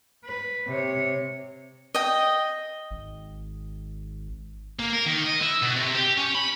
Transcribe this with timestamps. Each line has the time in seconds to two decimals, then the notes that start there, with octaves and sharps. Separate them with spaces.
0.24 B4
0.67 C3 C#5
1.94 D#5 G5
2.91 G#1
4.79 A#3
4.93 A#4
5.06 D#3
5.24 D#5
5.42 E4
5.63 B2
5.76 C3
5.95 G4
6.17 C#4
6.35 B5